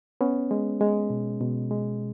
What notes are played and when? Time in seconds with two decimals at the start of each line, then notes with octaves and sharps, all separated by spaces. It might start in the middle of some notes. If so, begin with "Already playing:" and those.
0.21 B3 C#4
0.51 G#3
0.81 G#3
1.10 B2
1.40 B2
1.71 G#3